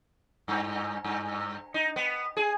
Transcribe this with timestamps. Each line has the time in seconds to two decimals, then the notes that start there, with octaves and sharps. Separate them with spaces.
0.48 G2
1.04 G2
1.74 D#4
1.96 B3
2.37 G#4